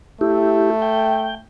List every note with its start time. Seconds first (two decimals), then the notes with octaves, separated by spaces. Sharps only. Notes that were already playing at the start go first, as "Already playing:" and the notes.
0.21 A3 E4 G4
0.82 G5